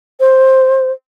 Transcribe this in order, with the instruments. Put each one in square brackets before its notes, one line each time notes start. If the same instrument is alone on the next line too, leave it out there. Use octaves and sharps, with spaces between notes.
[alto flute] C5